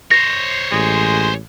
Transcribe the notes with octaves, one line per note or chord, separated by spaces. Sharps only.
C5 C#5 A#6
A1 G#3